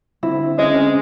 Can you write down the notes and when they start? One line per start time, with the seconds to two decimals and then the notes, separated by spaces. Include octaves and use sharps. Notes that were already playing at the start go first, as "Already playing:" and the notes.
0.23 D3 C4 E4
0.59 G#3 C#4 D#5